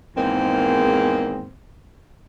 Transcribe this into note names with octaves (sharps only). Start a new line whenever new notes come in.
E2 G#2 D#3 A#3 C4